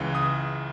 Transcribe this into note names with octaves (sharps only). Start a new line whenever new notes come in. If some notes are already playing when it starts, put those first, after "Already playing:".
Already playing: C#2 C#3 E3
D#6